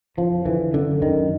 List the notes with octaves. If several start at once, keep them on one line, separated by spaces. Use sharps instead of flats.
F2 F3
D3 E3
F#2 D3
F#2 D#3